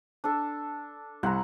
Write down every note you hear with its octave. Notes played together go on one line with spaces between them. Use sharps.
D4 A4
C2 F#5 A#5